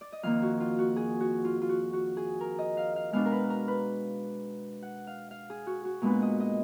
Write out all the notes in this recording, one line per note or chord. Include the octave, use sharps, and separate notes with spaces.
D5
D#5
F2 D#3 A#3 F5
F#4
F4
F#4
G#4
F#4
F4
F4
F#4
F#4
G#4
A#4
D#5
F5
F5
B2 G#3 B3 D4 F5
A#4
B4
A#4
B4
F#5
F5
F5
G#4
F#4
F#4
A#2 G#3 B3 D4 B4
D#5
D#5